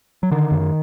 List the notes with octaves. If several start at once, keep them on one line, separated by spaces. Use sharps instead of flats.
F#3
D3 D#3
F#2